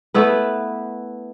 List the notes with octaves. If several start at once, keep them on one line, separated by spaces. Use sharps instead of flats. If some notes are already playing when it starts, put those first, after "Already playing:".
A3 B3 E4 B4